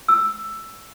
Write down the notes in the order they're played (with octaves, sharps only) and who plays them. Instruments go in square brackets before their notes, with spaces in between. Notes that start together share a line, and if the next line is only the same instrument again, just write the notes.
[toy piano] E6